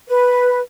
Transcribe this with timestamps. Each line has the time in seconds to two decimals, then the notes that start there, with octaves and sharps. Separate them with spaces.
0.09 B4